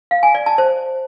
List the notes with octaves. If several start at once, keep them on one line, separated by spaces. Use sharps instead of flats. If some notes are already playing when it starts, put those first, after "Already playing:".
F5
G#5
D5
A5
C5